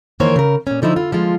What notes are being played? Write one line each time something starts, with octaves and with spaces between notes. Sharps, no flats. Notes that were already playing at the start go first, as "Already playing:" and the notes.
D#3 E3 A#3 A#4 C5 C#5
C#3 A#4
A#2 C#4
D3 F3 D#4 E4
F4
F3 G#3 F4